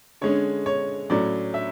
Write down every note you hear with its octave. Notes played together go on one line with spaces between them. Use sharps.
D3 G#3 C#4 C#5
C#5
A2 F#3 C#4 D5
E5